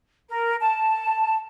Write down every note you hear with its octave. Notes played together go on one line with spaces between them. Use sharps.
A#4
A5